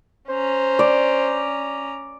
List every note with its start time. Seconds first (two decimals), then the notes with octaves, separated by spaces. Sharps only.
0.30 C#4 C5 A#5
0.79 D5